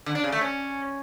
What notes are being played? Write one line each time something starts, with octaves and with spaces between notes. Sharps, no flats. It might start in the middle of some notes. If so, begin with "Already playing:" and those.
D3
D4
C#3
A3
C#4